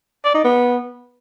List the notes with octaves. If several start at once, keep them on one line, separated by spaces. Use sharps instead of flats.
D5
D#4
B3